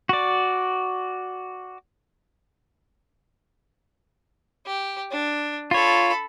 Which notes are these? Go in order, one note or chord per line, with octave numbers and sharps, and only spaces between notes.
F#4 D5
G4
D4
F4 A4 C#5 B5